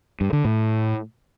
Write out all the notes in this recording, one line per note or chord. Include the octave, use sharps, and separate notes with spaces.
G2
D3
A2